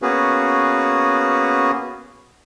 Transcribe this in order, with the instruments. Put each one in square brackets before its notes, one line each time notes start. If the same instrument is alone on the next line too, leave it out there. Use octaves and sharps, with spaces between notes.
[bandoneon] A#3 B3 C#4 F#4 G#4 B4